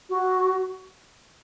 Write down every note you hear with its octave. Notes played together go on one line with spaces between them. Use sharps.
F#4